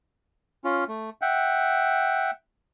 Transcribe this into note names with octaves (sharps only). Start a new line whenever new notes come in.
C#4 F4
A3
E5 F#5 G5